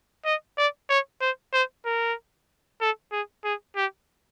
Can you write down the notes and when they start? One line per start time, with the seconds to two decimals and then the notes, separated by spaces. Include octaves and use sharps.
0.25 D#5
0.58 D5
0.90 C#5
1.21 C5
1.53 C5
1.85 A#4
2.81 A4
3.12 G#4
3.44 G#4
3.76 G4